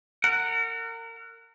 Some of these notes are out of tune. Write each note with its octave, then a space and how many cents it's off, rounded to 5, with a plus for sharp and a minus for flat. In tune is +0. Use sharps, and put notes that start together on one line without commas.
A#4 -30 F#5 +0